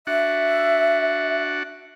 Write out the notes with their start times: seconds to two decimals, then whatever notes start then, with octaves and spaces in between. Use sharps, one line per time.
0.07 D4 F#4 E5 F#5